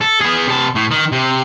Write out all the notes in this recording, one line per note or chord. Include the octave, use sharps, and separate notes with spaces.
A4
B3 G#4
C3 A5
A2
D#3
C3